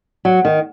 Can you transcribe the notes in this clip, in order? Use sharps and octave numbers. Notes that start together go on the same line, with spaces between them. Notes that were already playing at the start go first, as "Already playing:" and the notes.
F#3
D#3